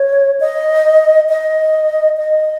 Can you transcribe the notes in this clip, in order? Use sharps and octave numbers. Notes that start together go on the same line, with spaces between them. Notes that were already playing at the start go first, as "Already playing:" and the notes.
Already playing: C#5
D#5
D#5
D#5